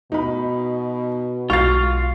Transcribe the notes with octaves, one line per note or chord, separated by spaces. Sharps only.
B2 D#4 B5
B1 G#3 F4 F#4 F5 C#6 A6